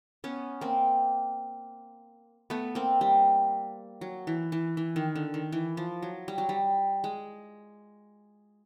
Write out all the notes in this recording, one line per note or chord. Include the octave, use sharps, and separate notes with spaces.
B3 C#4
A#3 C4
A3 B3
A#3 C4
G3
F#3
E3
E3
E3
D#3
D3
D#3
E3
F3
F#3
G3
F#3
G3
G#3